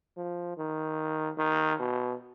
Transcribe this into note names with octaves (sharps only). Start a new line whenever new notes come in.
F3
D#3
D#3
B2